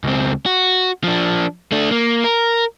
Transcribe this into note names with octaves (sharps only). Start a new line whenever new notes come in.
C#2 C4
F#4
F3 D4
A3 D4
A#3
A#4